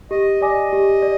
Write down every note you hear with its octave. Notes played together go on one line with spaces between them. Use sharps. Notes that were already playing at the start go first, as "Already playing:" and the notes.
G4 D#5
D5 D#5 G#5 D6
G4
D5